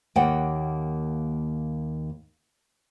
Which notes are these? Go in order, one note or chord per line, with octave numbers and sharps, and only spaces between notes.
D#2 A#3 C#5 F#5 G5